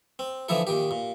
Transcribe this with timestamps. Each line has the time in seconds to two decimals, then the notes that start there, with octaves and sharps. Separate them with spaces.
0.19 C4
0.49 D3 E3 F3 D#4 E4 A4
0.67 A#2 D#3 G4
0.91 A#2